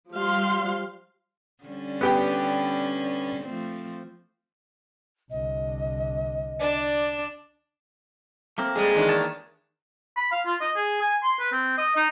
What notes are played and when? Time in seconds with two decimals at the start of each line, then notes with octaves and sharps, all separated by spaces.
0.12 F3 G3 G4 F5 C6
1.64 D3 G3 C#4
2.01 B3 G4 G5
3.44 F3 A3 C4
5.31 C2 D3 D#5
6.60 D4 D5
8.58 A3 A#3 C4
8.75 G3 G#3 G#4
8.95 E2 D#3 D4
9.09 D#2 C#5 A5
10.17 B5
10.32 F5
10.46 F4
10.61 D#5
10.76 G#4
11.01 G#5
11.23 C6
11.40 B4
11.52 C4
11.78 D#5
11.96 D#4